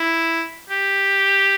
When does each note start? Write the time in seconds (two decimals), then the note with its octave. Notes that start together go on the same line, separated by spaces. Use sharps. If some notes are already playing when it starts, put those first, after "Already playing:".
Already playing: E4
0.70 G4